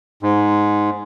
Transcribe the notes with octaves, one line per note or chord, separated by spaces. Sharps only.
G#2